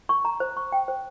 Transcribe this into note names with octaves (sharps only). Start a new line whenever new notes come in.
C#6
A#5
C5
C#6
G5
C5